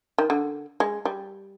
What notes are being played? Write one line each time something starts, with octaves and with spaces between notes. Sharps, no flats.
D#3
D3
G#3
G3